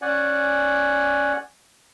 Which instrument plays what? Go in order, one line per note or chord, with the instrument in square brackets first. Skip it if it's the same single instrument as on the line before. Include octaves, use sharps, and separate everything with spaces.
[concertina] C#4 D5 F#5 G#5